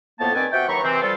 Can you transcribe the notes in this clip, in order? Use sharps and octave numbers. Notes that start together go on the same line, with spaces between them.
F2 A2 A#3 B3 A5
G2 D#3 C4 B4 D5 G#5
C3 F#4 E5 F#5 G5
D#2 E3 F#3 A#5 B5 C#6
C3 E3 C4
F3 G3 F4 A4